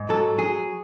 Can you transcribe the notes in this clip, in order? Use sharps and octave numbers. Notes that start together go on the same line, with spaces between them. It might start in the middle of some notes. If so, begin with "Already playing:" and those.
Already playing: G#2
F#3 A4
F#3 G#4